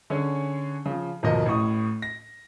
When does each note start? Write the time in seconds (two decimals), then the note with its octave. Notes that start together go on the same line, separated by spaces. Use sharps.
0.10 D3 C#4 G#4 C#5
0.86 C#3 F3
1.23 G#1 D#2 B2 F3 A#4 D#5
1.46 A1 A2 C#6 D#6
2.02 A#6